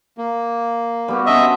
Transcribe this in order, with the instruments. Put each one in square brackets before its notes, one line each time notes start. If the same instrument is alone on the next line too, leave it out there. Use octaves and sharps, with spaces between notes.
[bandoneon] A#3
[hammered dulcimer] G3 B3 F#4
[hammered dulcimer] C#4 D4 C5 [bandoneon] D#5 E5